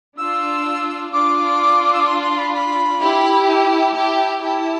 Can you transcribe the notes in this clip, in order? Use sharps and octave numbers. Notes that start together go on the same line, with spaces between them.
D4 F4 E6
D4 F4 D6
E6
D6
C6
C6
B5
B5
E4 G4
A5
E4 G4
E4 G4 A5